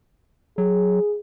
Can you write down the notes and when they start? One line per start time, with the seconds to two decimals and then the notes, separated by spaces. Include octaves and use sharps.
0.58 F#3 G#4